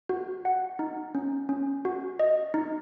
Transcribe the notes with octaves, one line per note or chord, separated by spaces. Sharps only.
F#4
F#5
D#4
C#4
C#4
F#4
D#5
D#4